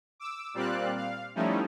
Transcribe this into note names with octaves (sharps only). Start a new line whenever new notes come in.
D6 E6
A#2 G3 C4 D5 F5 F#6
F5
F3 G3 A3 C#4 D#4 E4